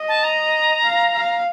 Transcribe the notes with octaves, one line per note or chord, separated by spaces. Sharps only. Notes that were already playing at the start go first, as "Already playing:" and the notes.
Already playing: D#5
A5
A#5
F5
F5